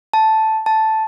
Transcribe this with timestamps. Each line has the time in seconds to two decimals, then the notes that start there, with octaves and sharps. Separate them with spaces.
0.14 A5
0.66 A5